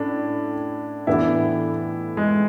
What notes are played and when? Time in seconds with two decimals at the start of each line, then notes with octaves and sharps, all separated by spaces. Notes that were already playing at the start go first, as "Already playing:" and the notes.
Already playing: A2 C#4 D4
1.07 A2 E3 B3 D4 E4 A4
2.17 G#3